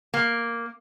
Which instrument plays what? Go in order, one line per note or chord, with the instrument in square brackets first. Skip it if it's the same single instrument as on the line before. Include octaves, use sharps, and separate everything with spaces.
[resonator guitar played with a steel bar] A#3